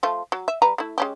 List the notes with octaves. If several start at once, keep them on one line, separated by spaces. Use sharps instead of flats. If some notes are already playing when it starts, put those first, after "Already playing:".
F3 A3 F4
F#3
E5
G3 B4 A#5
A3 E4
G#3 C#4 G4